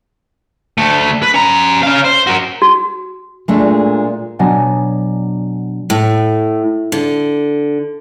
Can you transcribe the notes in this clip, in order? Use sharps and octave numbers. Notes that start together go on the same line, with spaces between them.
D2 A3
B4
C#4 A#5
C#4 F5
C5
F#4 A#4
F#4
A#2 G#3 A3 D4
B2 F#3 B3 D4 G#5
A2
D3